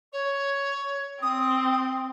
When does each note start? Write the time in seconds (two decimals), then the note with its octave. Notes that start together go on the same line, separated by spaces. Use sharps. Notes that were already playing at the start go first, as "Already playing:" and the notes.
0.12 C#5
1.21 C4 D#6